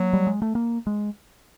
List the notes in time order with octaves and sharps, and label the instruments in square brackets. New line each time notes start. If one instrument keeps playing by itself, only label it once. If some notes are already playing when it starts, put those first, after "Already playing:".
Already playing: [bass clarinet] F#3 [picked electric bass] A#3
[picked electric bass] G3
G#3
A3
A#3
G#3